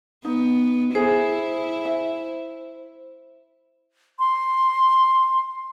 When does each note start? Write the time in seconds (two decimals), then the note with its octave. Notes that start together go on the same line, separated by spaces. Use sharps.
0.25 B3 D#4
0.95 E4 G#4 C5
1.85 E5
4.19 C6